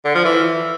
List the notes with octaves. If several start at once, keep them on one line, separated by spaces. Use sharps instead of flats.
D3
F3
E3